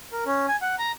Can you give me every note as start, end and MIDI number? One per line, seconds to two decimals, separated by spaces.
0.12 0.24 70
0.26 0.46 61
0.48 0.56 80
0.62 0.75 78
0.79 0.92 82